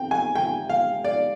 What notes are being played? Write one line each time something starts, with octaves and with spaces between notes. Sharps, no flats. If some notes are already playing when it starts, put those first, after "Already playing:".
Already playing: C4 G5
G#5
G5
F5
D5